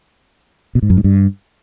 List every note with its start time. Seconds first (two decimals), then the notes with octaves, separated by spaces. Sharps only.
0.75 B2
0.82 G#2
0.90 F#2
0.97 G#2
1.04 G2